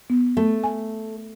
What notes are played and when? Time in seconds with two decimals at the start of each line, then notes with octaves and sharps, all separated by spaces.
0.10 B3
0.37 A3
0.64 G#5